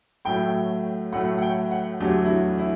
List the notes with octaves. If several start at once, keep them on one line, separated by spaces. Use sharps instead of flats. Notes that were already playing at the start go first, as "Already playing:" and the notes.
A2 F#3 A3 G5
A2 F#3 A3 F#5
F#5
G5
F#5
E2 D3 F#3 A3 G4
E4
F#4
E4